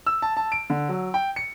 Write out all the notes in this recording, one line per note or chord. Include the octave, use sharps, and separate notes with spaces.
E6
A5
A5
D7
D3
F#3
G5
C#7